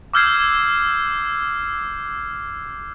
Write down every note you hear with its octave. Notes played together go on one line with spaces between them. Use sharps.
D6 E6 F6 G6 G#6 C7